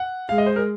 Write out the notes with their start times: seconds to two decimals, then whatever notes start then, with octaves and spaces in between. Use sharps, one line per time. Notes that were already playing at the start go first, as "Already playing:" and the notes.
Already playing: F#5
0.29 G#3 F5
0.38 D#5
0.46 C5
0.56 A#4